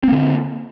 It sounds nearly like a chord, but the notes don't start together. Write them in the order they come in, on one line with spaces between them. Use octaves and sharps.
C4 A#3 D3